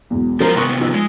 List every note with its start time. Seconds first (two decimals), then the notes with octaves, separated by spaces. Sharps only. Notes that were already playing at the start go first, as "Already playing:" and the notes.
0.10 E1 B1 E2
0.40 F3 F#3 A#4 C5 A#5
0.56 C3 D#3 B3 C6 C#6 D#6
0.80 F3 D#4 E6
0.94 G#3